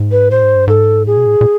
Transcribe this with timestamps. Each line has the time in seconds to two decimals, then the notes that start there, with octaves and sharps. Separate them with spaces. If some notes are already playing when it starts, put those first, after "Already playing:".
Already playing: G#2
0.12 B4
0.31 A2 C5
0.43 G#2
0.55 G2
0.67 G#2 A4
1.07 A2 G#4
1.17 B2
1.26 A2
1.41 A#2